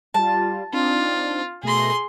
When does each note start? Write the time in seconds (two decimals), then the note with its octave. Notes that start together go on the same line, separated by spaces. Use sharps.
0.14 G3 F4 A5
0.73 C4 D4 D#4 F4
1.63 B2 A3 G#4 C6 A#6